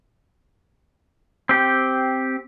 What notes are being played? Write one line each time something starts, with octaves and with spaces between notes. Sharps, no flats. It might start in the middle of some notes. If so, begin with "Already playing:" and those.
C4 G4